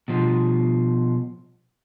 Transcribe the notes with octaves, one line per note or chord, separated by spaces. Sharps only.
B2 F3